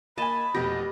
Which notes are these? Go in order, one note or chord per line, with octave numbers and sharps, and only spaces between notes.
A#3 D#5 G#5 A5 B5
F1 B2 G4 A#6